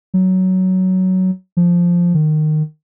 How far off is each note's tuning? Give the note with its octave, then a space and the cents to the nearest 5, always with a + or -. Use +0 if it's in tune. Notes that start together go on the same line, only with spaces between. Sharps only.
F#3 +10
F3 +0
D#3 -20